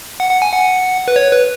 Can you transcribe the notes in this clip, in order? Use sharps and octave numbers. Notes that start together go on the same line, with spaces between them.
F#5
F#5
G#5
F#5
B4
C#5
B4